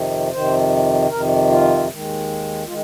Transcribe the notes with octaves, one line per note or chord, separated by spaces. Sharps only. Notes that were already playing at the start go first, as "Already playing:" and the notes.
Already playing: F2 C3 D#3
F2 C3 D#3 C5
F2 C3 D#3 A#4
F4
D#2 D#3 G#3
D#3 G#3 F4